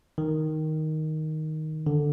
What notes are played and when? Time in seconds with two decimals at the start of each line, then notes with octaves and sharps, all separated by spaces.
0.18 D#3
1.87 D3